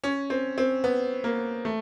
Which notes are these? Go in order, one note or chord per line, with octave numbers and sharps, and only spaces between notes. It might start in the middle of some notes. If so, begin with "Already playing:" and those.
C#4
C4
C4
B3
A#3
A3